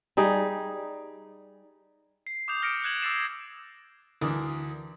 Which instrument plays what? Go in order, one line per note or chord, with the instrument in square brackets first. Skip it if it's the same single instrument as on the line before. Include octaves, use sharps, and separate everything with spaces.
[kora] G3 D#4 G#4
[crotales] C7
D6 D#6 G6 F7
F6 A#6 C#7 D7
F#6 G#6 E7 F#7
D6 E6 A6 C7 E7
[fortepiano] D2 E3 D4 A#4 D6 D#6